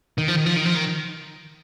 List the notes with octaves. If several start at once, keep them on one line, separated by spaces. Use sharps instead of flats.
D#3
F3
D#3
F3
D#3
F3
D#3